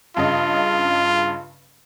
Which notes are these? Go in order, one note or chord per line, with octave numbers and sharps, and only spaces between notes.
G2 C#3 F4 D#5